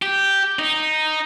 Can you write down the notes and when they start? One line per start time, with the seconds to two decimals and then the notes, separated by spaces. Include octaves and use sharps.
0.02 G4
0.59 D#4